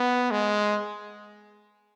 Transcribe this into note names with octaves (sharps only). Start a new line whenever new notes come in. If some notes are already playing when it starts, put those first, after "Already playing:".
Already playing: B3
G#3